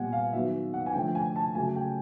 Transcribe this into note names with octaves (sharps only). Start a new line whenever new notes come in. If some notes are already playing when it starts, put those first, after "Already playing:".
Already playing: A#2 G3 B3 F#5 G#5
F5
D#3 F#3 B3 E5
F#5
G#5
D3 F3 A3 G5
G#5
A5
C#3 F#3 A3 G#5
G5